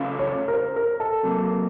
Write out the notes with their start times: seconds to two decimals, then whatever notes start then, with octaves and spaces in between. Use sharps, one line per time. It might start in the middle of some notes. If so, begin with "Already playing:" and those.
Already playing: C#3 A3 C#4 F4
0.19 C#5
0.48 A#4
0.54 C5
0.76 A#4
1.00 A4
1.23 C3 F#3 A#3